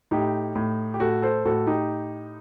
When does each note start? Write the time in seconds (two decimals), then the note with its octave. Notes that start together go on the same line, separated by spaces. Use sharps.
0.11 A2 D#4 G4
0.55 A2
0.94 G4
1.00 A2 F#4 A4
1.22 A4 C5
1.45 A2 F#4 A4
1.67 D#4 G4